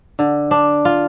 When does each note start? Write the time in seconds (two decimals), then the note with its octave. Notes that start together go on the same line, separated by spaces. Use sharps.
0.19 D3
0.51 D4
0.85 F4